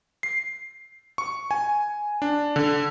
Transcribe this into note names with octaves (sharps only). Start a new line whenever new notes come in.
C7
C#6
G#5
D4
D3